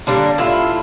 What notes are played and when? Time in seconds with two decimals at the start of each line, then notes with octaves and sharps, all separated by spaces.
0.07 D3 G3 A#3 D4
0.38 A2 E4 F4